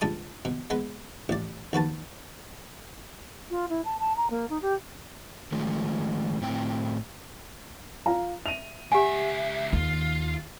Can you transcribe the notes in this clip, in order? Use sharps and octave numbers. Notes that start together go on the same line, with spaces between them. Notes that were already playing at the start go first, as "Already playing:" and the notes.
C#2 G2 A5 D#6
B2
G#3 B3 B4
A1 D5
D#2 F#4 B4 A5
F4
E4
A5
A5
A#5
A#3
D#4
G4
D#3 F3 G#3 A3
A2 C4 G5
F4 F5 A#5
E5 D#7 F7
C#2 G4 E5 F#5 G#5
D#2 D#3 F4